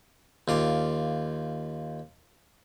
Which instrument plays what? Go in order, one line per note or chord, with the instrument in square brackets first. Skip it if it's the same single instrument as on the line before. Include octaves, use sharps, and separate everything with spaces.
[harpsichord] D#2 F4 D5